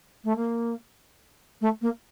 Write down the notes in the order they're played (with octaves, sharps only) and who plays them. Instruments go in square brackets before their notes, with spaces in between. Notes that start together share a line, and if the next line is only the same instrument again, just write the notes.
[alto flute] A3
A#3
A3
A#3